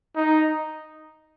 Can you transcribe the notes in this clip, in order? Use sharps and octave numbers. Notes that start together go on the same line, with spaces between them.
D#4